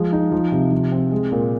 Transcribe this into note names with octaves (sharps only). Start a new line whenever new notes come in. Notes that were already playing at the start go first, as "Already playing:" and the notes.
Already playing: F3 G#3
D#4
F3
C3
F3
C4
G#3
A#2